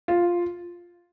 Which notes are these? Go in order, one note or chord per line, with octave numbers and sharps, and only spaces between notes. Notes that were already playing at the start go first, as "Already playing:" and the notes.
F4